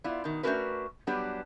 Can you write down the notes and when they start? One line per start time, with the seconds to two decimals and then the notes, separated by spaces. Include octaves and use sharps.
0.04 B3 E4 F4 D5
0.24 B2 D#3
0.43 A3 C#4 D4 F#4 A#4 B4
1.07 F#3 G3 B3 D4 G4 B4